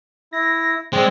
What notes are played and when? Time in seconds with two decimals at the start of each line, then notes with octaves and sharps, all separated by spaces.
0.33 E4 A#6
0.93 G#3 C4 D5